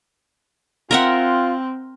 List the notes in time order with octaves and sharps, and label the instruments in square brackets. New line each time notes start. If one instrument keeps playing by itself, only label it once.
[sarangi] C4 [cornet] F4 [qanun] A#4 E5 F#5